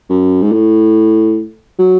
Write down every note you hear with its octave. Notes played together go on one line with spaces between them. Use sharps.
F#2
G#2
A2
F#3